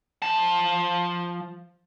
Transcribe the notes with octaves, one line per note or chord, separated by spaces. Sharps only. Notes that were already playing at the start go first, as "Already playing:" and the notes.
F3 A5